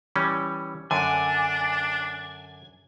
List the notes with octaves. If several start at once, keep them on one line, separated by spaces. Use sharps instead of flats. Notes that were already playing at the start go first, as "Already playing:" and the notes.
E3 G3 C#4
F#2 D3 D4 G#5